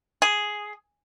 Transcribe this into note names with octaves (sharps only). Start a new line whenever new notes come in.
G#4